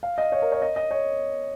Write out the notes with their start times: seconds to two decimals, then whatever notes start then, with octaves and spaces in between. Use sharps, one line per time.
0.03 F5
0.18 D#5
0.32 C#5
0.42 A#4
0.52 C#5
0.62 D#5
0.76 D#5
0.91 C#5